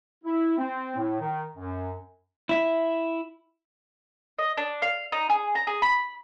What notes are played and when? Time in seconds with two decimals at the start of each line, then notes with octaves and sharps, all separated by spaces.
0.24 E4
0.58 C4
0.96 A2
1.20 D#3
1.56 F#2
2.49 E4 E5
4.39 D#5
4.57 D4
4.82 F5
5.12 D#4
5.30 G#4
5.55 A#5
5.67 G#4
5.82 B5